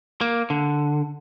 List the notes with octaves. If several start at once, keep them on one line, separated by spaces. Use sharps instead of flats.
A#3
D3